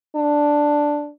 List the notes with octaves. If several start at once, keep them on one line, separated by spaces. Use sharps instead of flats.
D4